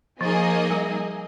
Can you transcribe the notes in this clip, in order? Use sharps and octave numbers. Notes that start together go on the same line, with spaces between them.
F3 A#3 D#4 G#4 D#5 G#5
G3